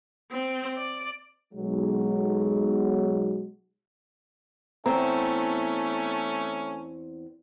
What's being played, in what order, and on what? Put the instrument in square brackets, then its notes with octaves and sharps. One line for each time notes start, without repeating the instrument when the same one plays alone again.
[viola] C4
D5
[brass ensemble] B1 F#3 G#3
[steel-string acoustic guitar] E2 C4 [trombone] A3 [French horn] C#4 [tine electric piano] A#5